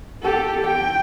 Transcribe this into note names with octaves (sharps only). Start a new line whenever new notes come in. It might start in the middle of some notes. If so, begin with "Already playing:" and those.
G4 A4
G5